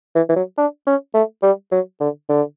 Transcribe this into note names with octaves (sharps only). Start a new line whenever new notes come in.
E3
E3
F#3
D4
C#4
A3
G3
F#3
D3
D3